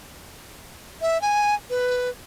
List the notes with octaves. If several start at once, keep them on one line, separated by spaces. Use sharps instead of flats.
E5
G#5
B4